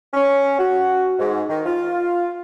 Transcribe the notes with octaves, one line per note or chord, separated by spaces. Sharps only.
C#4
F#4
G#2
D#3
F4